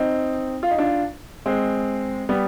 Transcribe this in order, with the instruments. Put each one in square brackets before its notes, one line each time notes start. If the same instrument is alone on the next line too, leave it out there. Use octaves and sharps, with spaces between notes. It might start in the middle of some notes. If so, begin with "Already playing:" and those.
Already playing: [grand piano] C4 D#4
F4
D#4
D4 F4
G#3 C4
G3 B3